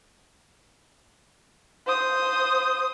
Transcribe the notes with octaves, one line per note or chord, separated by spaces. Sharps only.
C5 D#6